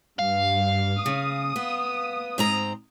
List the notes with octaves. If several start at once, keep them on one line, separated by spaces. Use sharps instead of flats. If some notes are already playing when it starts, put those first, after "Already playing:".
G2 F5
C#3 D#6
B3
G#2 C4 A#5